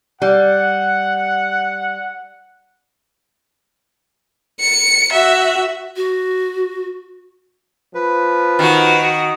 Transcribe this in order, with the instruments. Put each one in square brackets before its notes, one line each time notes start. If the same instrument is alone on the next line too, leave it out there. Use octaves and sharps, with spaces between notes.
[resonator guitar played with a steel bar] G3 [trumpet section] F#5
[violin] C#7
F#4 E5
[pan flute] F#4
[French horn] F3 [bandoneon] B4
[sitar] D#3 [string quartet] F#4